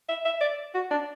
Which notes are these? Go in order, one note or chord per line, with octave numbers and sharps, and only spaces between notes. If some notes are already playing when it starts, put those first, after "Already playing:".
E5
E5
D5
F#4
D4